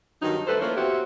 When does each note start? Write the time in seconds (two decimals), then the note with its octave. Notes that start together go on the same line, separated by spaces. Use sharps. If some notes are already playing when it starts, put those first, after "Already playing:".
0.22 G2 D#3 F#3 D#4
0.47 G3 A3 A4 B4 C5
0.61 F3 A#3 C#4 E4 C#5
0.76 B3 C4 E4 F#4 G4